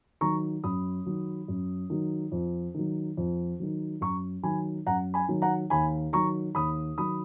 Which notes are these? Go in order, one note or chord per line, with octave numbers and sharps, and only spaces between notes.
D#3 F#3 A#5 C#6
F#2 B5 D#6
D#3 F#3
F#2
D#3 F#3
F2
D#3 F#3
F2
D#3 F#3
F#2 A#5 C#6
D#3 F#3 G#5 B5
F#2 F#5 A#5
G#5 B5
D#3 F#3
F#5 A#5
D#2 G#5 B5
D#3 F#3 A#5 C#6
D#2 B5 D#6
D#3 F#3 B5 D#6